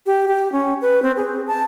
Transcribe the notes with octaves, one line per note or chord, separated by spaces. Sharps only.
G4
G4
C#4
B4
C4
G#4
A5